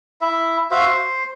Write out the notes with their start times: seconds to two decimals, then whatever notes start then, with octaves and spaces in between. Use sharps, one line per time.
0.21 E4 E5
0.71 F#4 C5 E5 F5
0.86 C5